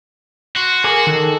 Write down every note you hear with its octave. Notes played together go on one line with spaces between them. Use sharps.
F#4 C6
G#4 A#4 D6
D#3 A4